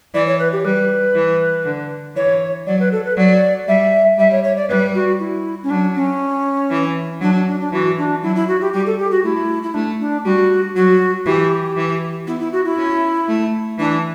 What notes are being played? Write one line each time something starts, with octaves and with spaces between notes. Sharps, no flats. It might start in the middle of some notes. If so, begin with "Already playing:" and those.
E3 D5
C#5
B4
G4
G3 B4
E3
D3
E3 C#5
F#3 D5
B4
A4
B4
F#3 D5
G3 E5
G3 E5
C#5
C#5
D5
G3 B4
F#4
E4
C#4
F#3 D4
C#4
E3
F#3 D4
D4
D4
D4
E3 F#4
D4
F#3 E4
E4
F#4
G4
G3 G4
A4
G4
F#4
A3 E4
E4
A3 D4
D4
G3 F#4
F#3 F#4
E3 G4
E3
B3 E4
E4
F#4
E4
C#4
A3
E3 D4